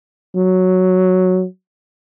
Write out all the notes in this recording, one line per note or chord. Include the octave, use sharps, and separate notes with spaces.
F#3